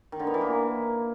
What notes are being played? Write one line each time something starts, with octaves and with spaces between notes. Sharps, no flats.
D#3
D3
B3
E3
A#3